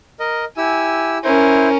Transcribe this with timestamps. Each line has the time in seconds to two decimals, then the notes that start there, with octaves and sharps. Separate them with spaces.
0.20 A#4 D#5
0.57 E4 G4 G#5 E6
1.24 C#4 E4 A#4 C5